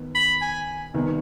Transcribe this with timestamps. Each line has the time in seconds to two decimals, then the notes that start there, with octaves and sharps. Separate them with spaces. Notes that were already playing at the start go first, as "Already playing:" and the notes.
Already playing: D#2 D#3 B3
0.15 B5
0.42 G#5
0.94 C2 C3 D#3 B3